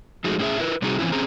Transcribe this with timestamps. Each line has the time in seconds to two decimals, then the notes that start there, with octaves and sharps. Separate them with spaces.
0.24 F3 G#3 A3 D#4 F#4 G#4
0.39 A2 C#4 E4 G#4 E5
0.60 E4 A#4 B4
0.82 C3 G3 C4 D#4 F#4 G#4
0.99 E3 F3 C4 C#4 E4
1.12 C4 C#4 G#4 C5 A#5